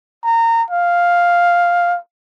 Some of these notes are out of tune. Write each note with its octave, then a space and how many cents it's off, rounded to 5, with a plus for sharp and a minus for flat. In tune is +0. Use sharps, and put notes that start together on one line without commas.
A#5 -25
F5 +5